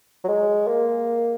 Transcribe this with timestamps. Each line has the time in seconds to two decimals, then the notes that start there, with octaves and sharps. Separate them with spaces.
0.24 F#3
0.28 G#3
0.67 A#3